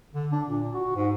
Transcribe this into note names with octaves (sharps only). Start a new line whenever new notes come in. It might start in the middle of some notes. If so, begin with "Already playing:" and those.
D3
D4
A#2
F#4
G#2